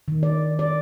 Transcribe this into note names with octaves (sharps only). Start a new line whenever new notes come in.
D#3
D5
D5